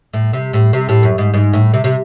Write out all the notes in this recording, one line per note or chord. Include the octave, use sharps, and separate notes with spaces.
A2
C3
A2
C3
A2
F#2
G#2
G#2
A2
C3
C3